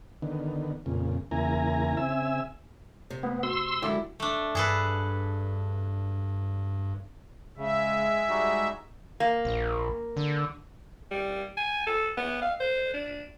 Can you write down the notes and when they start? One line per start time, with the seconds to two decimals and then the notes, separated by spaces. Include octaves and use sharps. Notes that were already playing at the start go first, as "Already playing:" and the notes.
0.22 D3 D#3 B3
0.86 F2 A#2 C#3
1.31 E2 C#3 A#3 E4 G#5 A#5
1.97 C#3 C4 E5 G#5 E6
3.10 C3
3.23 A3 B3
3.43 F#4 C6 E6
3.82 F#2 D3 G#3 E4 D6
4.20 A3 D4
4.55 G2 G#4 A4 B4
7.57 C#3 G#3 E5
8.29 G3 D#4 F#4
9.20 A#3
9.45 A#1
10.16 D3
11.11 G3
11.57 G#5
11.87 A4
12.17 B3
12.42 F5
12.60 C5
12.94 D4